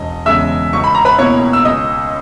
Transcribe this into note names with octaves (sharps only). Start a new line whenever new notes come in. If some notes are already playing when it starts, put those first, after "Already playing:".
Already playing: E1 D#5
E2 C#3 G#3 E5 E6
C#2 C#6
B5
A#5
B4 B5
B2 A#3 E4 C#5 C#6
E6
C#2 D#5 D#6